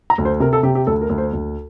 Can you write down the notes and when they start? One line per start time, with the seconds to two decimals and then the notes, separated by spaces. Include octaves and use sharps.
0.10 A#5
0.18 D2
0.25 C5
0.40 C3 A#4
0.53 A4
0.63 C3 G4
0.75 G4
0.87 D2 A4
1.02 A#4
1.09 D2
1.18 C5
1.33 D2